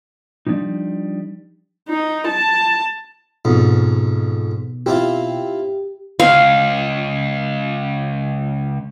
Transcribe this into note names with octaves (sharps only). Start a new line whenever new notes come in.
F3 G3 A#3 D4 D#4
D#4
A5
F2 G#2 B2
C4 E4 F4 G4
C#2 F5